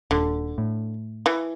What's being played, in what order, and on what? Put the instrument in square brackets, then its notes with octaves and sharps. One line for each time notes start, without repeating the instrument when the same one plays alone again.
[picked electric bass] D#1 [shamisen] D3
[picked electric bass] A2
[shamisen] E3